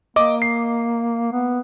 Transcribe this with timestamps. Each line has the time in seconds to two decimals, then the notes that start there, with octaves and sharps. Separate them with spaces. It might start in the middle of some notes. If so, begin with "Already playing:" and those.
0.16 A#3 D#5 D6
0.42 C7
1.32 B3